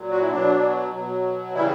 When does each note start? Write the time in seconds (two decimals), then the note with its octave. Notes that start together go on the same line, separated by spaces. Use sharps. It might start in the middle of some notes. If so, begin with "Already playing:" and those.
Already playing: A#2 F#3
0.11 F#4
0.21 E4
0.30 B2 F#3 D4
0.92 B2 F#3
1.54 C#3 E3 G3 E4